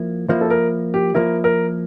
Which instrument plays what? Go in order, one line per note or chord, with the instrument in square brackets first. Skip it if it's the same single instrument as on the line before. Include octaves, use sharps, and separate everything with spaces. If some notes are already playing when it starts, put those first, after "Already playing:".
Already playing: [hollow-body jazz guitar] F3 A#3 E4
[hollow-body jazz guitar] F3 A#3 E4 [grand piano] C5
[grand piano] A4
A#4
G4
[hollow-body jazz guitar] F3 A#3 E4 [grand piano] A#4
[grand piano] A#4